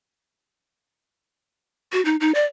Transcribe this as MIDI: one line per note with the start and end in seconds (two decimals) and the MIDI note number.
1.92 2.03 66
2.05 2.16 63
2.20 2.32 63
2.35 2.45 74